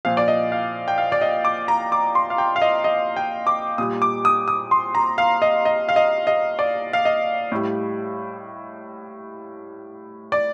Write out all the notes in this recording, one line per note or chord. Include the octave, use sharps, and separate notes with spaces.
A#2 F3 F5
D5
D#5
F5
G5
F5
D5
D#5
D6
A#5
D6
C6
F5
G5
F5
D#5
D#5
G5
D6
A#2 G3 D#6
D6
D#6
D#6
C6
A#5
F5
D#5
D#5
F5
D#5
D#5
D5
F5
D#5
A2 G3
D5